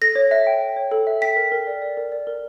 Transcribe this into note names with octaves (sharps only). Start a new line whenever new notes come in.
A4 A#6
C#5
E5
G5
E5
C#5
A4
E5
G5 B6
A#4
A#4
D5
D5
A#4
D5
A#4